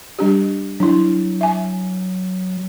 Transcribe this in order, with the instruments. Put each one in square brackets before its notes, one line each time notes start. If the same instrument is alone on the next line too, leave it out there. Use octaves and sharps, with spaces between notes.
[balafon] G3 D4 G4
[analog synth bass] F#3 [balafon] D4 E4
[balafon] E5 G#5